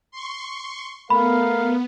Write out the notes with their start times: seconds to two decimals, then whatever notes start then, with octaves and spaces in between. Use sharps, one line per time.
0.11 C6 C#6
1.10 A3 B3 A#4 F5 B5